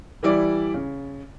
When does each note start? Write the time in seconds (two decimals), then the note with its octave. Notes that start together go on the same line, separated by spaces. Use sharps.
0.23 E3 G3 E4 D5
0.74 C#3